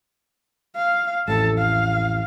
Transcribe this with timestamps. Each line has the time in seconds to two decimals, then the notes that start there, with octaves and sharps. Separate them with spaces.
0.76 F5
1.28 A1 F2 A2 A4 A5
1.58 F5